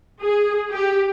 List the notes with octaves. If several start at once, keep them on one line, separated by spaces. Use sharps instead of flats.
G#4
G4